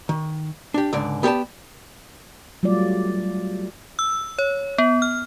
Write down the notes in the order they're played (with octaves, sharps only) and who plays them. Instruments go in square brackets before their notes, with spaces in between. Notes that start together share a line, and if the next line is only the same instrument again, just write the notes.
[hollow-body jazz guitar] D#3
D4 G4
C#2 G#2 D3 D5
B3 G4 B4 D5 A5
[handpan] F#3 G3 A3 F4 D5
[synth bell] E6
C#5
B3
F6